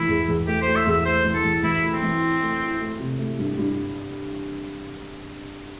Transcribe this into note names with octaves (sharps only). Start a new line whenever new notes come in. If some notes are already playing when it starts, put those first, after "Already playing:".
Already playing: E3 A3 E4
E2
E2
A3 G4
A3 C5
E5
E2 E5
A3 C5
E3
A4
E3
E3 E4
A3
C4
E3
E4
A3
E4
A3
C3
A3
G2
G2